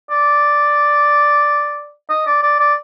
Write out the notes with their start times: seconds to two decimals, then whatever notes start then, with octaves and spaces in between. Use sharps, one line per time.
0.11 D5
2.10 D#5
2.27 D5
2.43 D5
2.59 D5